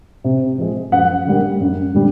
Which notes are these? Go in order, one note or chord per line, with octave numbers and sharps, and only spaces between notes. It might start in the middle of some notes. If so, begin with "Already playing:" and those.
C3
F3 G#3
F#2 F#5
D3 G3 A#3
F#2
D3 G3